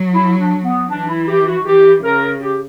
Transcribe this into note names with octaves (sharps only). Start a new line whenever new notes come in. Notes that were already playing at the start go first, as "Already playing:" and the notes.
Already playing: F#3
E4
D4
B3
E3 D4
E4
G4
F#4
E3 G4
C#3 A#4
G4